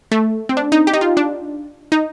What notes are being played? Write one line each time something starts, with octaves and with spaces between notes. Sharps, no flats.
A3
C4
D4
D#4
G4
D#4
F4
D4
D#4